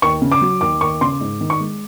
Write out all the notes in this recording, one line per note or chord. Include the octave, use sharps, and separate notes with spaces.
D#2 C#6
C#3
D6
F#3
D#2 D6
D#2 C#6
C#3 C6
G#2
D#3
C#6
G#3